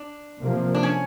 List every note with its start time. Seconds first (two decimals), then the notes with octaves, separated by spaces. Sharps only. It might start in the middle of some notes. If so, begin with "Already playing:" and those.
Already playing: D4
0.41 C3 F3 A#3
0.74 D4
0.83 C#4